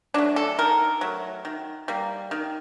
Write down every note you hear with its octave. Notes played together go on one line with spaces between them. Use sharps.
F#3 A3 D4
A4
D#3 A#4
F#3 A3
D#3
G3 A#3
D#3